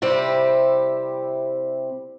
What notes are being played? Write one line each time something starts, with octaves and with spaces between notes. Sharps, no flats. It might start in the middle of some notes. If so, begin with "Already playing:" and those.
C3 G3 C4 E4 G4